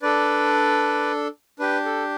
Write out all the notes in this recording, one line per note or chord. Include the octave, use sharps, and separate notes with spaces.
D4 A4 B4 D5
D4 G4 B4
A4